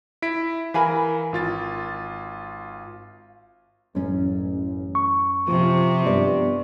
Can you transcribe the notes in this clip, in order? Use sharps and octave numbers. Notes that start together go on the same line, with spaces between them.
E4 B6 D7
E3 A#4 F5 G#5 B5
G#1 F4 A6
A1 F#2 C#4
C#6
C3 F3
G2 B3 G4 D5